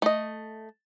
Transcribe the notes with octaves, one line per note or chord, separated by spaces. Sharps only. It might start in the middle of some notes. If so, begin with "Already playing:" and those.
A3 D#5